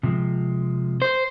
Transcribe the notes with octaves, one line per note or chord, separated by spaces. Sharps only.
C3 F3 G#3
C5